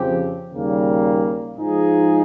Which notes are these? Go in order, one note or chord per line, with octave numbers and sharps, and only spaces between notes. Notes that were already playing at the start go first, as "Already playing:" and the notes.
Already playing: F2 C#3 F3 C4 G4
D#2 C#3 G3 A#3
G#2 F3 G#3 D#4 G#4